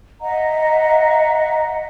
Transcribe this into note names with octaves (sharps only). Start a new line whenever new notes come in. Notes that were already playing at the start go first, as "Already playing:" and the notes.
D#5 E5 F#5 A#5